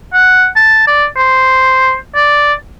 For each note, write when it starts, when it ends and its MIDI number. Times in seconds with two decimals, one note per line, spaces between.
0.13 0.47 78
0.56 0.84 81
0.87 1.05 74
1.17 1.94 72
2.15 2.53 74